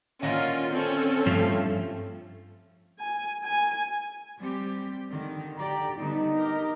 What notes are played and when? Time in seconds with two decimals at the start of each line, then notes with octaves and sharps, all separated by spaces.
0.22 A#2 D3 D#3 C#4 F4
0.72 C4 C#4 A4
1.26 G2 F3 A3 G4
3.00 G#5
3.44 G#5
4.38 G3 C4 G4
5.09 D3 D#3
5.58 D3 G4 D5 G5 A#5
5.98 D3 G3 B3 D#4
6.36 G4 A#4